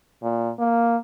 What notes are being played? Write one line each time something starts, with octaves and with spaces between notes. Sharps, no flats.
A#2
A#3